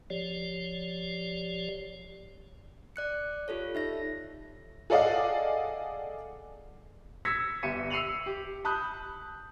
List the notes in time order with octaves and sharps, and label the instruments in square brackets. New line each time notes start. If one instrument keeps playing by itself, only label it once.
[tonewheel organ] F3 G4 C#5 D5
[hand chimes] D5 F#6 C#7
F4 G4 A4 C#5
D#4 E5 A#6
[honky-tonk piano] G#4 A4 D5 D#5 F5 F#5
[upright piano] E6 G#6 A#6 B6 C#7
G1 G4 E5 C#7 D#7
E6 C7 C#7 D#7 F7 F#7
G4
A5 B5 D#6 F#6 G6